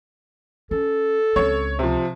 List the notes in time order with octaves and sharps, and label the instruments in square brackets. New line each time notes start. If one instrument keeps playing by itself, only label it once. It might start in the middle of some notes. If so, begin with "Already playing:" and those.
[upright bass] C#4 [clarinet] A4
[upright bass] C#2 C4 [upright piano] C#5
[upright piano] C3 F3